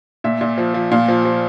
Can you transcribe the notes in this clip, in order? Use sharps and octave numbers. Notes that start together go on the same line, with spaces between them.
A#2 E5
A#2
F3
F3
A#2 F5
F3
F3